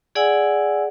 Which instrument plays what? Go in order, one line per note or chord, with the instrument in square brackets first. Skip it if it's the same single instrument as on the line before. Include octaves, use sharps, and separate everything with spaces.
[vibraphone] G#4 D5 F#5 G#5 E6